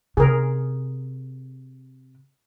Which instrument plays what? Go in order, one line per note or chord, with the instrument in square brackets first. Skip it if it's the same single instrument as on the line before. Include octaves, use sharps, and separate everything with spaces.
[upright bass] C3 [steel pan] G#4 A#4